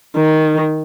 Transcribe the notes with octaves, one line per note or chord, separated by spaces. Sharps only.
D#3